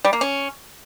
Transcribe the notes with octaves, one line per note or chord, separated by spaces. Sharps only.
G3
A#3
C#4